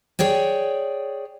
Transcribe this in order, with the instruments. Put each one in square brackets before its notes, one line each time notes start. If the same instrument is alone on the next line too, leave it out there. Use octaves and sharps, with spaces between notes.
[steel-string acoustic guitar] G#4 C#5 D5 G5